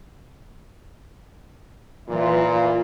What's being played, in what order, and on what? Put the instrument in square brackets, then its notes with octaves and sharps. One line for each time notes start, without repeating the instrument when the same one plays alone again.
[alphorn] A#2 [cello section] E3 F4